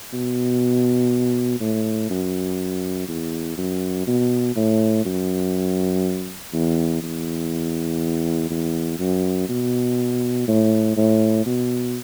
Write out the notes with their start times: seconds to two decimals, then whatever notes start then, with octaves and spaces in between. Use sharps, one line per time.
0.13 B2
1.60 A2
2.10 F#2
3.08 E2
3.58 F#2
4.07 B2
4.56 A2
5.05 F#2
6.53 E2
7.03 E2
8.50 E2
8.99 F#2
9.49 B2
10.48 A2
10.97 A2
11.46 B2